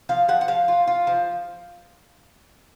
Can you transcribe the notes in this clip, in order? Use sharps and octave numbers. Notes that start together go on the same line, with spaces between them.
F3 F5
F3 F#5
F#5
F3 F5
F4
F4
F3